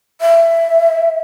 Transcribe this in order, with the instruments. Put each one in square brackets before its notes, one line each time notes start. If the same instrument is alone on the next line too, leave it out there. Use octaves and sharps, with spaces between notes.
[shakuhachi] E5